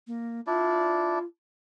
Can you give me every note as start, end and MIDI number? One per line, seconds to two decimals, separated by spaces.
0.07 0.41 58
0.47 1.19 62
0.47 1.19 64
0.47 1.24 65
0.47 1.19 74